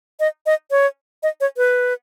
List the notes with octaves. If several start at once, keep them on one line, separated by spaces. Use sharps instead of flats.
D#5
D#5
C#5
D#5
C#5
B4